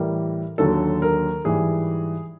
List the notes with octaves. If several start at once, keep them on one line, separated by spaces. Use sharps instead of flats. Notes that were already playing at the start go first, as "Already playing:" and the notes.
Already playing: A2 E3 G3 A#4
D#2 D3 F#3 A4
A#4
G#2 E3 G3 G#4